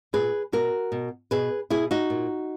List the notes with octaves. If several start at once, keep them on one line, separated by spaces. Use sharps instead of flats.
A#2 G#4 B4
B2 F#4 A#4
B2
B2 G#4 B4
B2 E4 G#4
D#4 F#4
A#2